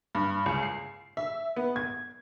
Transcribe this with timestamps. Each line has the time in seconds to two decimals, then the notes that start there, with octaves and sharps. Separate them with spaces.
0.15 G2
0.46 C#2
0.63 C7
1.17 E5
1.56 B3
1.76 G#6